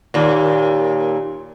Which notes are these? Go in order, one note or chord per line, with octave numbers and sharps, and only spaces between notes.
D#2 A#2